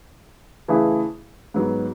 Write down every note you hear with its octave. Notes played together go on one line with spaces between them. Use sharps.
C#3 E3 A3 E4 G#4
G#2 F#3 B3